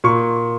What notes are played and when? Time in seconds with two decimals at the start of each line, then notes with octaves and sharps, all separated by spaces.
0.04 A#2 C#6